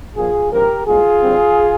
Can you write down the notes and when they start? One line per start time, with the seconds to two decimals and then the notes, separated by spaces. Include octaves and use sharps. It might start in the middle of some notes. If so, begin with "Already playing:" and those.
0.16 A#1 A#2 F3 A#3 F4 G#4
0.51 A#1 G#2 F3 C4 G4 A#4
0.86 C2 A#2 G#3 F4 G#4
1.22 D#2 D3 G3 C4